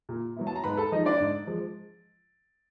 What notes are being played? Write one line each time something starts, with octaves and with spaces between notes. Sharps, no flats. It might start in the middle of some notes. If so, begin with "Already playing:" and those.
A#2
F#3 B3 E4
A5
A#5
G#2 B4 B5
A4 A5
F3 G#3 D#4 D#5
D4 D5
G#2
F3 G#3